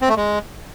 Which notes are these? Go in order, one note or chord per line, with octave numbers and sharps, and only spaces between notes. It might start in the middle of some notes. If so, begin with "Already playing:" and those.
C4
A3
G#3